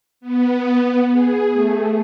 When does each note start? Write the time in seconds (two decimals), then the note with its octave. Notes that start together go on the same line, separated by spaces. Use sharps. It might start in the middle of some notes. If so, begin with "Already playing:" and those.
0.21 B3
1.12 G#4
1.51 A3